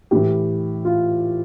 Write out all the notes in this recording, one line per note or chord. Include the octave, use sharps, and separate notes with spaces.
A2 E3 G4
F4